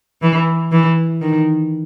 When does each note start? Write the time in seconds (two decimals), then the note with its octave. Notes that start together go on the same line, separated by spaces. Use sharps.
0.22 E3
0.71 E3
1.21 D#3